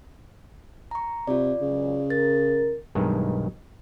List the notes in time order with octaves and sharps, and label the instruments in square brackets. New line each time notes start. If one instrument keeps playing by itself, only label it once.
[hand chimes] A#5 C#6
[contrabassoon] C3 [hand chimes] F4 D5
[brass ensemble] C#2 F#2 [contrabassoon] C#3
[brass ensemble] A#4 [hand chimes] A6
[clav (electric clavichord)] B1 G2 D#3 G#3